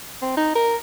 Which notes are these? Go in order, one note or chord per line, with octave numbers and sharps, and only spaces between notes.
C4
D#4
A#4